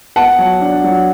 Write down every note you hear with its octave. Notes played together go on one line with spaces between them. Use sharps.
B3 F#5 A5
F#3
D4
F#3